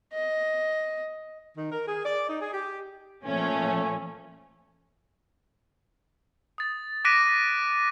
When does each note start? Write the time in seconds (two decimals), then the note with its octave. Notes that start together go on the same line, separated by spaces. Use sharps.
0.14 D#5
1.57 D#3
1.71 A#4
1.87 G#4
2.04 D5
2.29 D#4
2.41 G#4
2.53 G4
3.26 A#2 F3 A3 C#4
6.58 D#6 A6
7.05 D6 F#6 A#6 B6 D7 D#7